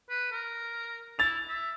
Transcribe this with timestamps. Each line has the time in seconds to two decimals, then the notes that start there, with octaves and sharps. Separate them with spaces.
0.10 B4
0.32 A#4
1.19 E4 A6 F7
1.48 E5